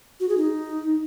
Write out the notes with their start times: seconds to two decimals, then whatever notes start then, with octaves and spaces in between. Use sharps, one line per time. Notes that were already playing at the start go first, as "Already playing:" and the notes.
0.20 F#4
0.29 G#4
0.37 D#4